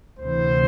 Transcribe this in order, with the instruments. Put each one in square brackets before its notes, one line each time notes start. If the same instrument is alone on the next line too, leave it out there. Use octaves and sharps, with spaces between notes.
[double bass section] D2 C3 E3 [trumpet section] C5